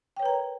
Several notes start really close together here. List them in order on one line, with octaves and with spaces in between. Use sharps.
G5 C#5 B4 A#5 A#4